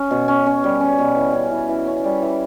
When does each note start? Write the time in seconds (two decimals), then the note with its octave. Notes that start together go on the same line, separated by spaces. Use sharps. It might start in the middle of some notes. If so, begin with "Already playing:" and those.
Already playing: C#4
0.11 B2
0.28 C#4
0.46 C#4
0.64 G3
0.80 C#4
0.99 B2
1.16 E3
1.34 C#4
1.51 E3
1.69 E3
1.86 C#4
2.04 G3
2.22 E3